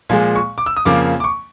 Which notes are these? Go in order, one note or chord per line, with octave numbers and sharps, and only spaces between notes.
A#2 F3 G#3 G#5
C#6
D6
E6
D#6
F2 C#3 F3 A#3 D6
D6
C#6